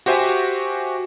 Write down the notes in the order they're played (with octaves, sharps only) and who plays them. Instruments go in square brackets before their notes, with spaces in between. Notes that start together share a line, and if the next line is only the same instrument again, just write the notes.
[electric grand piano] F#4 G4 C5 E5 G#5